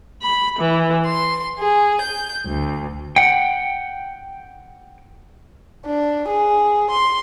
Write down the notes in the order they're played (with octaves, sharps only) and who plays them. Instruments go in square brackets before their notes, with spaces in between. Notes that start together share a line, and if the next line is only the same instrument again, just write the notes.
[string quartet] B5
E3
C6
G#4
G6
D2
[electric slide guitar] F#5 G5
[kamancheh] D4
G#4
C6